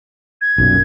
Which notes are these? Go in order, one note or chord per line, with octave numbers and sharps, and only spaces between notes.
G#6
B1 F#2 A#2